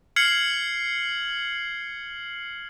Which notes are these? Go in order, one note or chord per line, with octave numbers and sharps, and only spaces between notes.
F6 G#6 C7 C#7 F#7